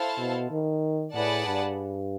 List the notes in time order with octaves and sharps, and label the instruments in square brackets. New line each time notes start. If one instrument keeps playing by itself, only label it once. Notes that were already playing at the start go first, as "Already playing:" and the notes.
Already playing: [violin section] E4 A4 C5 F5 A5
[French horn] B2
D#3
[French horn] A2 [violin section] G#4 B4 D5 F#5 A5
[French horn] G2